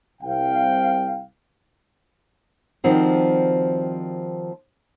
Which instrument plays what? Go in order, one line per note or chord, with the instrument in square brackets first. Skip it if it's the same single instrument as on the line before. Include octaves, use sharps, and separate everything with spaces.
[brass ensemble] C2 F5 G5
[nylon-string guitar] D#3 F3 G3 C4 F#4